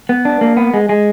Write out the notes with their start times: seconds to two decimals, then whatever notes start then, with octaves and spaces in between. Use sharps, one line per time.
0.09 B3
0.25 D4
0.41 A#3
0.57 B3
0.74 G#3
0.89 G#3